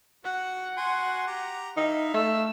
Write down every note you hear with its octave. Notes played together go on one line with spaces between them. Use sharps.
F#4 F#5
F#4 G#5 C6
G4 A#5
D#4 E4 E5 F5
A3 E6